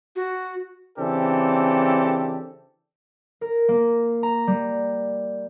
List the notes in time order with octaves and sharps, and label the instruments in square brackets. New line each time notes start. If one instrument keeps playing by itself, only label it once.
[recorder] F#4
[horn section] C#3 E3 C4 D4 G4 A4
[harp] A#4
A#3
A#5
G3